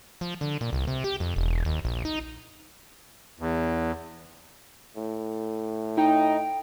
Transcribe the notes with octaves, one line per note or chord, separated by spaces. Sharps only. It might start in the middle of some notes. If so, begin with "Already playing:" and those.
F3
D3
A#2
C2
C3
G4
F2
E1
D#2
A#1
D#4
E2
A2
D#4 G5